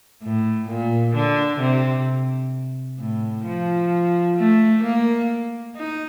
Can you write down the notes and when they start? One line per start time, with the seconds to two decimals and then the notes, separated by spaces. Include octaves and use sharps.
0.23 A2
0.69 A#2
1.15 D3
1.60 C3
2.99 A2
3.45 F3
4.37 A3
4.83 A#3
5.76 D#4